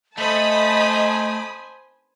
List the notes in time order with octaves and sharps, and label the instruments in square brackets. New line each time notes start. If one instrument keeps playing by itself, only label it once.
[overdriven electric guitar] A3 [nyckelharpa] C5 G#5 [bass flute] D#5 [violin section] A5 B5 D#6